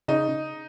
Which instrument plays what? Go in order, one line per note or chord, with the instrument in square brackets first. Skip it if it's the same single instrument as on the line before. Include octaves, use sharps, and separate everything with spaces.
[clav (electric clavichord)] C#3 [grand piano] D#4